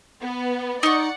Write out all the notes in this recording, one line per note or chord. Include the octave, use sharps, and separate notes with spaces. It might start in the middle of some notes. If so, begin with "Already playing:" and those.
B3
D#4 D5 F#5 C#6